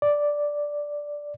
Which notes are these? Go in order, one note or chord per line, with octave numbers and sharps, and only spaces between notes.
D5